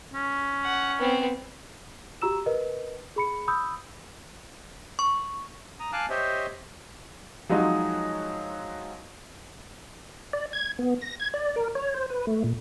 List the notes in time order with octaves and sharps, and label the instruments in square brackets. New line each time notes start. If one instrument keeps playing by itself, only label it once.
[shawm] C#4
[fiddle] F#5
B3 C4
[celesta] F#4 G4 A#5 E6 E7
A#4 B4 D#5
G#4 B5 C#7
B5 D#6 E6 G6
[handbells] C#6
[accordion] A#5 D#6
F5 G#5 A5 D6 F6 F#6
G4 C5 C#5 D#5 E5
[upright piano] F3 F#3 G#3 D#4 F#4
[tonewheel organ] D5
G#6
B3
A#6
G#6
D5
A#4
C#5
C5
B4
A3
A#2